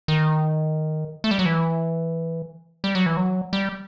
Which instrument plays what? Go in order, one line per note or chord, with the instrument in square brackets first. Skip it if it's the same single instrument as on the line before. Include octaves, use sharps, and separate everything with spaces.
[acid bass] D#3
A3
G3
F#3
E3
G3
F#3
E3
F#3
G3